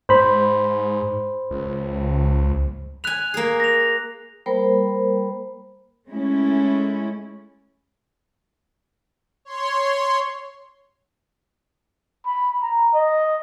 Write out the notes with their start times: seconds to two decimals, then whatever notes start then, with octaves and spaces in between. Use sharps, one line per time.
0.09 G#2 C5 B5
1.51 C#2
3.04 G#5 B5 F#6 F7
3.34 A#3 G#4
3.60 A#6 F7
4.46 G3 A#3 A#4 C5 G5 B5
6.08 G#3 A3 C#4 E4
9.45 C#5 C6
12.26 B5
12.62 A#5
12.94 D#5